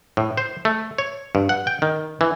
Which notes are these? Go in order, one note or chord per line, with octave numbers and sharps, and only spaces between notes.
A2
C5
A3
C#5
G2
F#5
G5
D#3
E3